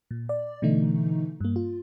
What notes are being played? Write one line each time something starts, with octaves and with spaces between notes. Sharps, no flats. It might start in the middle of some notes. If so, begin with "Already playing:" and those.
A#2
D5
B2 D3 E3 A3 D#4
G2 A#3
F4